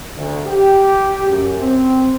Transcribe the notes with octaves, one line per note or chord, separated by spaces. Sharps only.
D2
G4
F#2
C4